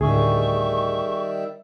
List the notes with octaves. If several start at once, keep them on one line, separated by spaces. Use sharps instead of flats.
D2 A2 D#3 G3 G#4 E5 C#6